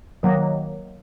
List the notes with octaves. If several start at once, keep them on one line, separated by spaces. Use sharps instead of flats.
D#3 F#3 A#3